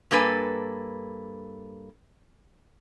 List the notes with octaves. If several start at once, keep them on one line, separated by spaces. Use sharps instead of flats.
G2 A#3 A4 B4 G#5